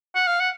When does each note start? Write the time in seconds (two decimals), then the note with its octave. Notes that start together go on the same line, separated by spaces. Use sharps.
0.15 F#5
0.27 F5
0.40 F#5